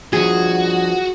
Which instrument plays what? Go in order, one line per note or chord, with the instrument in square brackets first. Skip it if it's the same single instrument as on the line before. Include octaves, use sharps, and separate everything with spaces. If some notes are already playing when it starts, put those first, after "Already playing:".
[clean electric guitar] G2 F3 [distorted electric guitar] F#4 [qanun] G#4